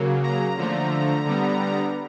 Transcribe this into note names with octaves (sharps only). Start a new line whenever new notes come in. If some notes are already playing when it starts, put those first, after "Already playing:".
Already playing: C#3 F#3 A#3
A#5
D3 F3 A3
D3 G3 B3